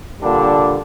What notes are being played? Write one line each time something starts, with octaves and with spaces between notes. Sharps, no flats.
A#2 D3 G3 D4